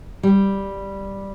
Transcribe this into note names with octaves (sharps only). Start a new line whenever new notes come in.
G3